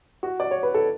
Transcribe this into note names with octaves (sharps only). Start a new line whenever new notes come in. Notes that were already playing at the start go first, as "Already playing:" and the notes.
F#4
D5
C#5
B4
A4